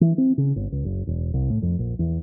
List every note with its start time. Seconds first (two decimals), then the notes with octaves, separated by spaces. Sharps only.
0.01 E3
0.18 C4
0.38 C#3
0.56 G1
0.72 C#2
0.85 F#1
1.07 E1
1.34 C2
1.50 A2
1.62 F2
1.79 A#1
1.99 E2